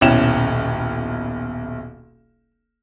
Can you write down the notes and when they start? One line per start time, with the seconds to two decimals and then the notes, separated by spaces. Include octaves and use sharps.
0.01 D#1 B1 C#4 E4 G5 E7